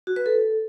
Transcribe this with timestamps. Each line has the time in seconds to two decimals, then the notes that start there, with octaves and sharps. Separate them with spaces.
0.07 F#4
0.16 B4
0.26 A4